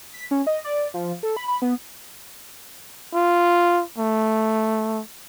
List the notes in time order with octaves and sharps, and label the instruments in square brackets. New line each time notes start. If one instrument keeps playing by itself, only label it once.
[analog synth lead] B6
C#4
D#5
D5
F3
A4
B5
B5
B3
[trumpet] F4
A3